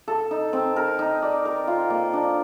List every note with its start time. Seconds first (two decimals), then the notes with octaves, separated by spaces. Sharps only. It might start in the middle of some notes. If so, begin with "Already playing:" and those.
0.08 A4
0.31 D#4
0.53 C4
0.76 A#4
0.99 D#4
1.22 D5
1.45 A#4
1.67 F4
1.90 A#3
2.13 D4